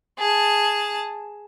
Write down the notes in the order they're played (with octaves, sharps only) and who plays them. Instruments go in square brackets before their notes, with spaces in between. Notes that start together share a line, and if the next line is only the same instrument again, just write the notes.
[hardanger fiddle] G#4 A5